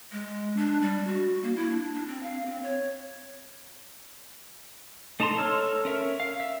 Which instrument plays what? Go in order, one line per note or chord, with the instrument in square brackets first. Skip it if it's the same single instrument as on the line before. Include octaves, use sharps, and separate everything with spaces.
[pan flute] G#3
D4
G3
F#4
A#3
E4
D4
D4
C4
F5
C4
C#5
[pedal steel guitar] A3 D#4 A5 A#5 C6
A4 C#5 E6 F6
C#4 A#4 E5
F5
E5